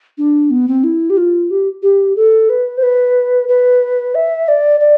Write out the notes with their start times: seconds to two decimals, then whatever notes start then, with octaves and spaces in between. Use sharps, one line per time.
0.18 D4
0.51 B3
0.68 C4
0.84 E4
1.10 G4
1.17 F4
1.51 G4
1.83 G4
2.16 A4
2.49 B4
2.78 C5
2.83 B4
3.48 B4
4.15 E5
4.48 D5
4.80 D5